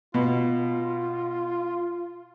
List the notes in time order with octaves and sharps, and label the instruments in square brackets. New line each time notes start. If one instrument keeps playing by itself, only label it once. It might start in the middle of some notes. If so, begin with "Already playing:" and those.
[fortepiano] B2 [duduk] F4